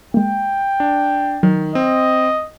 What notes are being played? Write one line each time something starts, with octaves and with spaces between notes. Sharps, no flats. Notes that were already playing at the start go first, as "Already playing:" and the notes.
G#3 A#3 G5
D4
D#3 F#3
C4 D#5